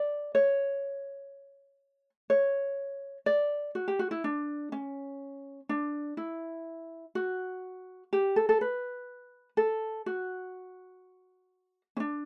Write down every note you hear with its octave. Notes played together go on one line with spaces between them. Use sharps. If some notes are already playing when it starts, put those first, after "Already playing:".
Already playing: D5
C#5
C#5
D5
F#4
G4
F#4
E4
D4
C#4
D4
E4
F#4
G4
A4
A4
B4
A4
F#4
C#4
D4